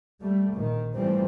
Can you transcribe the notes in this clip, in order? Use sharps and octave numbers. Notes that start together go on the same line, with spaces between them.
G3 A3
A#1 D#3
A2 E3 F3 G3 A3 C4